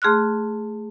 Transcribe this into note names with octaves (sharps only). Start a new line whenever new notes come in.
A3 G#4 C6 F6 F#6